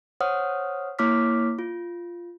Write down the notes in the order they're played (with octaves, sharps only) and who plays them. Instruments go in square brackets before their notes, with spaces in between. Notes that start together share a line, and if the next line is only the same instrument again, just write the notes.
[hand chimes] C5 C#5 F#5 D#6 F6
A#3 E4 C#5 D6 F6 B6
F4